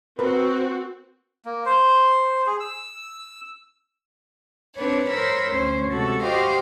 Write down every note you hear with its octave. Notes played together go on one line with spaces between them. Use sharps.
C4 F#4 A#4 B4
A#3
C5
G#4
E6
C4 D4 B4 C#5
A#4 C5 C#5 B5 E6
D2 C#4 C5
C3 G#3 F#4 A4
F#4 G4 C5 D#5 F5 G5